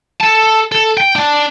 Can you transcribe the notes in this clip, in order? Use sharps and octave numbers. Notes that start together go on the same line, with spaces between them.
A4 A5
A4
G5
D4